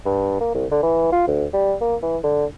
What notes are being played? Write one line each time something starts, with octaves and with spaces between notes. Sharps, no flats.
G2
A#3
C2
D3
E3
F4
D2
G3
A#3
E3
D3